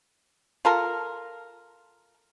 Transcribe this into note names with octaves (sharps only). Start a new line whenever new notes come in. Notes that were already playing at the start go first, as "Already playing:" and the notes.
F4 A4 A#4